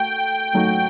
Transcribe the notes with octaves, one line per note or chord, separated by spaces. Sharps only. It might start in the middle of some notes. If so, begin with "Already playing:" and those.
Already playing: A3 F#4 G5
A2 F#3 A3 D#4 F#4